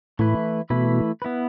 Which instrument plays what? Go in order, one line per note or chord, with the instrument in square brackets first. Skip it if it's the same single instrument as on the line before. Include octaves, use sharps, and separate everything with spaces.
[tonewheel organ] A2 [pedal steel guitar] E3 A3 E4 B4
[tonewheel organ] B2 [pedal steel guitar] E3 A3 E4 B4
[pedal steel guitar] B3 E4 B4